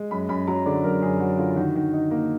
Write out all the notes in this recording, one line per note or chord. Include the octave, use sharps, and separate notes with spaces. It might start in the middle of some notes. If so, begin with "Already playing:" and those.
Already playing: G#3
F#2 B5
F#2 B5
F#3 A#5
D3 D5
F#2 A#4
F#2 G#4
F#3 F#4
D3 F4
D#3 F#4
D#3
D#4
A#3